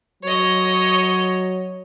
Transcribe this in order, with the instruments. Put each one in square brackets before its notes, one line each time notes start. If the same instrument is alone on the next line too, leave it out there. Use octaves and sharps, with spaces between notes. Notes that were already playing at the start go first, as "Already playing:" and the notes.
[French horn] F#3 [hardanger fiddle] C#5 D#5